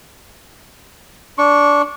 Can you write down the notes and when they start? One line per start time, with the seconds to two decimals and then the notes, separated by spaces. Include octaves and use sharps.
1.38 D4 C#6